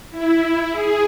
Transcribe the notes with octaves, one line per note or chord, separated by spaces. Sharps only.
E4
G#4